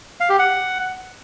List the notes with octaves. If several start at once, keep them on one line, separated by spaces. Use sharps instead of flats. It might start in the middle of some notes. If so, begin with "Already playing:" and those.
F5
G4
F#5